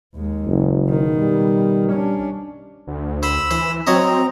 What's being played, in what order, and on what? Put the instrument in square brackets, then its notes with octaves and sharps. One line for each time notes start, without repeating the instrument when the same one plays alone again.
[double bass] D#2 G#3
[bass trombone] F#1
[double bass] B2 D#3
[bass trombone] G3
[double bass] C#4 D4
[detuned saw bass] D2
[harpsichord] C5 [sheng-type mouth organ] B5 E6
[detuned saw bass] E3 [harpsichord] C5
[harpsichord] F#3 C#5 D#5 [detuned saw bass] C4 [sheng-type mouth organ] A#5